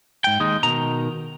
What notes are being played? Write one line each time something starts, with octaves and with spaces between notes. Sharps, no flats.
G#2 G5
D#2 G#3 D#4
B2 D#3 A#5